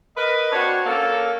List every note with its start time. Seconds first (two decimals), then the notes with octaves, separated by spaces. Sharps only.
0.16 A#4 B4 D#5
0.52 C4 D4 F#4 A4 C#5
0.86 A#3 C#4 A4